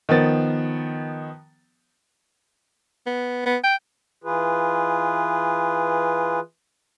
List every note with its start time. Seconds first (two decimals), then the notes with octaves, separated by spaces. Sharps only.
0.09 D#3 F3 B3 A6
3.06 B3
3.46 B3
3.64 G5
4.24 E3 F4 G#4 B4